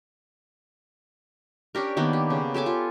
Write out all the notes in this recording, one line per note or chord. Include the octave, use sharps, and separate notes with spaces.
C#4 D4 G4 A#4
D#3 A#3 B3 D4
G4
C#3
G4 A4 G#5 D6
F4